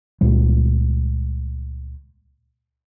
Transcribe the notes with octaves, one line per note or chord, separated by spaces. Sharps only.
C#2 A#2 G3